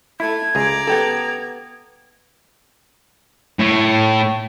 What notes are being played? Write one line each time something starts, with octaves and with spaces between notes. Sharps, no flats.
A3 E4 G#6
C#2 G#4 D5 A#5
B3 G4 A4
A2